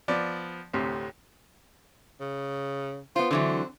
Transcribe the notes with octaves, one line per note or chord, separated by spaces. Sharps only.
F3 B3 D5
D2 A2 C3
C#3
B3 F4 C5
D3 E3 F#3 C4